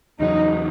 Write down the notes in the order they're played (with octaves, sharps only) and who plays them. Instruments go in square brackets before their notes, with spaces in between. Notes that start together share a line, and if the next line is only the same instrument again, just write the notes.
[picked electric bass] E2 C#3 F#3 [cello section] D#4